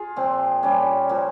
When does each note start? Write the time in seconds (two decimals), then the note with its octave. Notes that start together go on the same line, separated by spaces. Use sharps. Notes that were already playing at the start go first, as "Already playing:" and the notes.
Already playing: F4 G#4
0.16 A#2 F3 C4
0.63 A#2 G3 A#3 C#4
1.09 A#2 F3 A#3